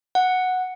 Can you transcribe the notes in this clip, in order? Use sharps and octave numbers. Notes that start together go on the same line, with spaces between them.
F#5